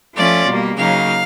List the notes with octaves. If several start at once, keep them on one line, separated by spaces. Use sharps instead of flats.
F3 A3 C#4 F4 D5
B2 G3 A#3
C#3 F#3 A#3 D#4 F5